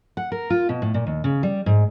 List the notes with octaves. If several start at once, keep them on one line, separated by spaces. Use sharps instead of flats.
F#5
A#4
F4
B2
A2
A#2
D#2
C#3
G3
G#2